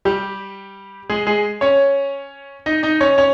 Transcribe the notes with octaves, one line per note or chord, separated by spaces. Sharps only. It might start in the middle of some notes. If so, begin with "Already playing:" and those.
G3 G4
G#3 G#4
G#3 G#4
C#4 C#5
D#4 D#5
D#4 D#5
C#4 C#5
C#4 C#5